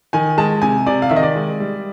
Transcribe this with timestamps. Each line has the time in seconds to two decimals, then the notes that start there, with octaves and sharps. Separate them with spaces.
0.13 D#3 G#5
0.38 G#3 A5
0.62 C3 G#5
0.86 C3 D5
1.02 F5
1.10 D#3 E5
1.16 D#5
1.23 D5
1.36 G#3
1.60 G3